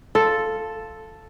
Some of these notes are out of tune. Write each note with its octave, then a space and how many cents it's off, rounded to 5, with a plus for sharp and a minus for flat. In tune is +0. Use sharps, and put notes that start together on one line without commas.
F4 +0 A4 +0